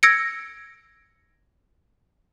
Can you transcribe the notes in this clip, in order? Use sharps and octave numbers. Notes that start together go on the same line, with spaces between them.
E6 G#6 A#6 C#7 D7